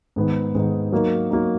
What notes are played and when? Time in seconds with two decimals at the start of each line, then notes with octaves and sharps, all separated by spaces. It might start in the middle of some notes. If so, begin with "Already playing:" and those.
0.16 G#2 D#3 G#3 B3 D#4
0.55 G#2 D#3 G#3 B3 D#4
0.92 F#3 A#3 D#4 A#4
1.31 F#3 A#3 D#4 A#4